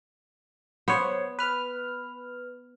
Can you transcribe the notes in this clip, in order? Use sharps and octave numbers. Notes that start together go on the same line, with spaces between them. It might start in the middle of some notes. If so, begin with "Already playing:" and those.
B3 C5 C#5
B4 F6